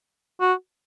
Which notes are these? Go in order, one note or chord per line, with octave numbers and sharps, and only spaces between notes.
F#4